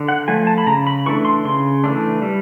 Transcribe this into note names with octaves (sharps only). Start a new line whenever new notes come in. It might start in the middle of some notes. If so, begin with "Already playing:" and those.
Already playing: D3
F#5
F3 A3 G#5
A5
B5
C#3 A#5
B5
E3 A3 D4 C#6
C6
C#3 C6
E3 A3 D4
G3